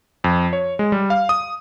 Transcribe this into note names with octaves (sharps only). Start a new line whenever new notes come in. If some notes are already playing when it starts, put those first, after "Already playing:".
F2
C#5
G#3
G3
F5
D#6